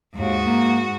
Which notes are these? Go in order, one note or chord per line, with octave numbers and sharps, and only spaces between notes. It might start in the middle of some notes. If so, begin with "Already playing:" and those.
D#2 G#2 F#4
A#3